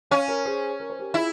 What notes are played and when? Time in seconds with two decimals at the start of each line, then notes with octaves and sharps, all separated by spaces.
0.11 C#4 C#5 F5
0.28 A#4 C#5
0.45 G#4 C5
0.80 A#4
0.90 C5
0.99 G4 A#4
1.14 E4 F4 G#4